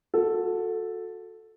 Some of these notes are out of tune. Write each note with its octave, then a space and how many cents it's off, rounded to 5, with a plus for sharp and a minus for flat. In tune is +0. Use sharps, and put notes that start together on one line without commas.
F#4 -30 A4 +0